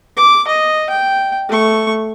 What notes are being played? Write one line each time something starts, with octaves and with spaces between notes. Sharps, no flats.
D6
D#5
G5
A3 C#6